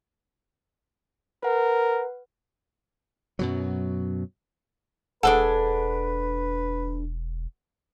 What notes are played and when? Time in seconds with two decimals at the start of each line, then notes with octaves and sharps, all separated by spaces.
1.43 A#4 B4 F#5
3.39 F#2 B2 F#3
5.23 E1 D4 G#4 A4 B4 C5 F#5